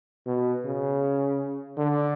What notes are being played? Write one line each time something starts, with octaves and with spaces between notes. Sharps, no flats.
B2
C#3
D3